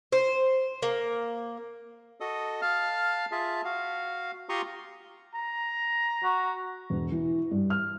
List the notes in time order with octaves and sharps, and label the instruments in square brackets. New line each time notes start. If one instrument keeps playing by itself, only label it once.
[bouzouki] C5
A#3
[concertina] F#4 A4 D#5 D#6
F5 A5 F6
F4 G#4 E5 A5
F#4 F5
F4 G4 A#5 C6 C#6 D#6
[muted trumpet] A#5
[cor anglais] F#4
[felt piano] E1
E3
G2
F6